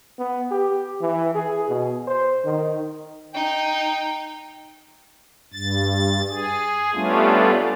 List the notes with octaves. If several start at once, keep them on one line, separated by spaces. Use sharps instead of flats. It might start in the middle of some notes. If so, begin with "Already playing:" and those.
B3
G4
E3
G#4
B2
C5
D#3
D#4 G5
G2 A6
G#4
G3 A3 B3 C#4 D4 F4